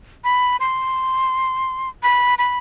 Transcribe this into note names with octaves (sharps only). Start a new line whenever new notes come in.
B5
C6
B5
B5